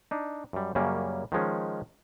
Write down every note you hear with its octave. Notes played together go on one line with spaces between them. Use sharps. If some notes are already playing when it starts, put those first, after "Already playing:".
D4 D#4
F#2 G3
F#2 C#3 G3 A#3 C#4
D#3 F3 G#3 C#4